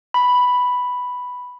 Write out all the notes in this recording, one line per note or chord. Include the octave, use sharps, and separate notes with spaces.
B5